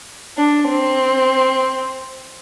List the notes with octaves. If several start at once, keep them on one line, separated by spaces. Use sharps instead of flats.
D4
C4